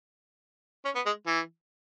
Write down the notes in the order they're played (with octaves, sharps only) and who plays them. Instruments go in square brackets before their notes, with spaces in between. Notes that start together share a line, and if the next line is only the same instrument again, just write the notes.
[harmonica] C#4
B3
G#3
E3